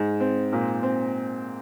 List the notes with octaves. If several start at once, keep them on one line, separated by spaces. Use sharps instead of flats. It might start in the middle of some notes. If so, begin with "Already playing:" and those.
Already playing: G#2
C4
A#2
C4